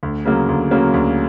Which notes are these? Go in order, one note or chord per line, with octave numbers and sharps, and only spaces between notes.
D2
C#3 F#3 A#3
D2
C#3 F#3 A#3
D2